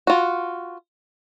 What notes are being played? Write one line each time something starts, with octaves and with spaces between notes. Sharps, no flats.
F4 F#4